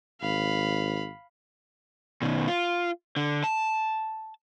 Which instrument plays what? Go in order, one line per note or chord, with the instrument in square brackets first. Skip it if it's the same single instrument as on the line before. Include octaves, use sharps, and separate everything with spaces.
[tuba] G#1 [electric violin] F5 B5
[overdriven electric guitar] B2 D#3
F4
D3
A5